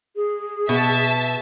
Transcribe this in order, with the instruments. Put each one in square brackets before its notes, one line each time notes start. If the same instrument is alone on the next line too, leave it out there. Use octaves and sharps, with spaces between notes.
[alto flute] G#4
[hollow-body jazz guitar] B2 [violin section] E5 A5